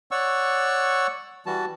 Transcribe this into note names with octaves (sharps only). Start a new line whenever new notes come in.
C#5 D5 F#5 C#6 E6
E3 G3 F#4 A5